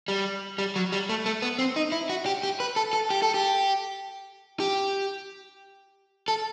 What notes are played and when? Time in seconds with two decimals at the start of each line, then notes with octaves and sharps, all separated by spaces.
0.08 G3
0.58 G3
0.76 F#3
0.92 G3
1.09 A3
1.26 A3
1.42 B3
1.59 C4
1.76 D#4
1.92 E4
2.09 F#4
2.26 G4
2.43 G4
2.60 B4
2.76 A4
2.93 A4
3.10 G4
3.22 A4
3.34 G4
4.60 G4
6.28 A4